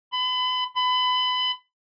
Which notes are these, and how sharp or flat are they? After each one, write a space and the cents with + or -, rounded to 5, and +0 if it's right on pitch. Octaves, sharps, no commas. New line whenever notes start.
B5 +35
B5 +30